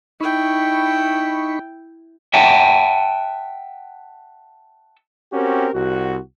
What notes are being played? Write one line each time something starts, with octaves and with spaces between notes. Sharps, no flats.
D#4 E4 G5 B5 C#6
E5 F#5 G5 A5
C4 C#4 F#4 G4 A#4
C2 F#4